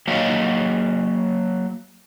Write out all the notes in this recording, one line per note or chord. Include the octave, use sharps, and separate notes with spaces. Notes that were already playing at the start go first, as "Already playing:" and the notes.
F#3 A#3 C#5 D#5 F5